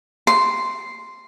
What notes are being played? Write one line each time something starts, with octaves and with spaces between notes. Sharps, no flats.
C6